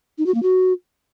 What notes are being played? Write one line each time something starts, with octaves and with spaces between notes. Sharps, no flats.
D#4
F#4
A#3
F#4